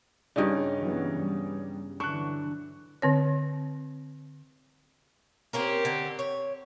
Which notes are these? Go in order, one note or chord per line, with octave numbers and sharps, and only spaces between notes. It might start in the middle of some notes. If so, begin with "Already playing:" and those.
G2 C#3 C#4 D#4 D5
E3 F#3 B3
G3 B3
D3 E3 F#3 D4 C#6 F#6
D3 C4 C#5
A#3 C4 C#4 G4 A#4
D3
C#5